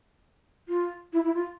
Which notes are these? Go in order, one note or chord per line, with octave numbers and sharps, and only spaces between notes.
F4
E4
E4
F4